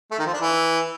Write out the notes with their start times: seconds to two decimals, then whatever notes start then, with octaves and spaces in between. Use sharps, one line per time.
0.11 A3
0.19 D#3
0.26 F3
0.33 D4
0.41 E3